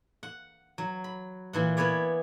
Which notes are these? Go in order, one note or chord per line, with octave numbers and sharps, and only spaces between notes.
F#5
F#3
B5
A#2 E3 F#5
B3 E4 B4 C#5 D5